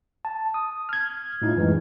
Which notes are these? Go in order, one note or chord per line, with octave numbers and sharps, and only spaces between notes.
A5
D#6
F6 G#6
A2 D#4 F4
F#2 E3 G#3